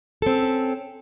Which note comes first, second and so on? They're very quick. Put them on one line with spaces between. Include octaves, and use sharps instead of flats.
A4 C4 C#4